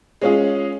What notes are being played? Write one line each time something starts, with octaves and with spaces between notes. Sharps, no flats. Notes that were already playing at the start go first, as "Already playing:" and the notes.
G#3 C#4 F4 G#4